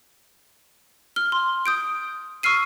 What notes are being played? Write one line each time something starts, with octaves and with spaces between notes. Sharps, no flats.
F6 G7
C6
D#6 G6 D7
C#6 E6 F6 C7 D#7